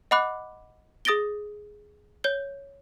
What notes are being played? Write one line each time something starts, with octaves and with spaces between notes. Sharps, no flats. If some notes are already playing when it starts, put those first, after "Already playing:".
D#5 F#5 B5 D6 F#6
G#4 D#6 A6 A#6 D7 G7
C#5 G6 G7